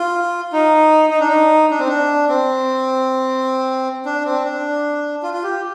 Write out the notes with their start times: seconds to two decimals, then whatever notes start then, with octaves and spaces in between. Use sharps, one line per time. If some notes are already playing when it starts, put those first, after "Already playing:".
Already playing: F4
0.53 D#4
1.11 D#4
1.20 D4
1.28 D#4
1.71 D4
1.79 C4
1.88 D4
2.29 C4
4.06 D4
4.25 C4
4.44 D4
5.23 F4
5.34 F4
5.43 G4